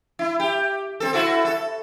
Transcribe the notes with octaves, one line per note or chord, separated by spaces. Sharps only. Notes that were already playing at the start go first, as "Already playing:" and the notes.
E4
G4
C4 A4
E4 F#4 A4
A4